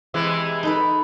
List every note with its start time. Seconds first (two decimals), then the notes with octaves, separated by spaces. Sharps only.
0.14 C3 E3 G#3
0.63 D#4 A4 B4